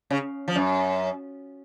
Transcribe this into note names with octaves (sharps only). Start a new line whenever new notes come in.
C#3
F3
F#2